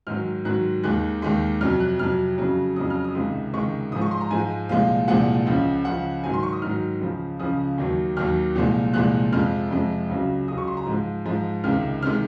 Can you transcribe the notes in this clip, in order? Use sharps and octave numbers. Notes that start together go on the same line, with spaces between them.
G#2 D#3 F#3 F6
G#2 D#3 F#3 F#6
D#2 D#3 G#3 F#6
D#2 D#3 G#3
F2 C3 F#3 F6
F#6
F2 C3 F#3 F6
F2 C#3 F#3
F2 C#3 F#3 D#6
F6
D#6
C#2 C3 D#3 G#3
C#2 C3 D#3 G#3 C#6
G#2 F3 G#3 D#6
C#6
C6
A#5
G#2 F3 G#3 G#5
C2 A#2 F3 G#3 F5
C2 A#2 F3 G#3 F#5
C#2 C#3 F3
C#2 C#3 F3 F#5
G#2 D#3 F#3 G#5
C6
C#6
D#6
G#2 D#3 F#3 F6
C#2 C#3 F3
C#2 C#3 F3 D#6
D#2 D#3 F#3
D#2 D#3 F#3 F6
C2 A#2 F3 G#3
C2 A#2 F3 G#3 F#6
F2 C3 F3 G#3 F6
F2 C3 F3 G#3
C#2 C#3 F#3
C#2 C#3 F#3 D#6
C#6
C6
A#5
G#2 F3 G#3
G#2 F3 G#3
C#2 C3 D#3 G#3 F6
C3 D#3 G#3 F6